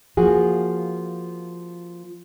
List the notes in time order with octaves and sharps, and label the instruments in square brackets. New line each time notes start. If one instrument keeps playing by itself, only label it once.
[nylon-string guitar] F3 A#3 F#4 G#4